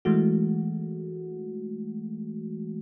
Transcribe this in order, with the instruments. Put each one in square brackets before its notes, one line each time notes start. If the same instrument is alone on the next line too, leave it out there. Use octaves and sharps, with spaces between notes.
[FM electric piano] E3 G#3 A3 F#4